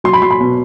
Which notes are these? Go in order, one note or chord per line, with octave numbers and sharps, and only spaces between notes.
F#3 C6
B5
F#3 C6
B5
B2